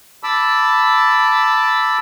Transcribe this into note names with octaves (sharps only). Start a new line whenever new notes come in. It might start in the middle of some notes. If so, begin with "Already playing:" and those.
A5 B5 D6 E6